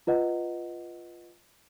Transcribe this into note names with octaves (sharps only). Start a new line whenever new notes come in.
F4 B4 D#5 F#5